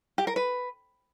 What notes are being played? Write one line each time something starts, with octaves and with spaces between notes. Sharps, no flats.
G4
A#4
B4